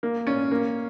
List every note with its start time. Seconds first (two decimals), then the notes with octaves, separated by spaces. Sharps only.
0.03 A#3
0.27 C#4
0.51 A#3